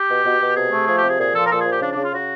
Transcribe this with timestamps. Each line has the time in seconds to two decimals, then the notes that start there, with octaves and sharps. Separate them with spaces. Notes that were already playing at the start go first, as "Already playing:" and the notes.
Already playing: G4
0.09 B2
0.25 B2
0.41 B2
0.56 C3 G#4
0.72 A3
0.87 F3 G#4
0.97 G4
1.03 C3
1.08 G#4
1.19 A#2 G#4
1.35 F3 A4
1.45 A#4
1.50 A#2 A4
1.60 G#4
1.66 F3
1.71 G4
1.81 C#3 D4
1.92 D4
1.97 C#3
2.03 F4
2.13 C#3 F#4